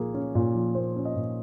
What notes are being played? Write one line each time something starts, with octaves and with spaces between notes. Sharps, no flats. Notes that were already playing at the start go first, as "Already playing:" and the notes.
Already playing: A#2 F3 A#3 G#4
C#4
A#2
F3
A#3 C5
C#4
D#5
A#2